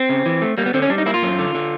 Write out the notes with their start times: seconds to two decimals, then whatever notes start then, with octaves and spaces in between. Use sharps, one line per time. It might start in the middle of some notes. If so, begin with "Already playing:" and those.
Already playing: C4
0.09 C#3
0.26 E3
0.42 A3
0.58 G3 A#3
0.66 B3
0.74 D3 C4
0.82 C#4
0.90 G3 D4
0.98 D#4
1.06 A#3 E4
1.14 F4
1.23 F#2
1.39 D3
1.55 D3